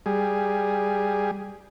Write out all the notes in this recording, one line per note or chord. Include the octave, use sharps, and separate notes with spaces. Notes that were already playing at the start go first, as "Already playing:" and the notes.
G3 G#4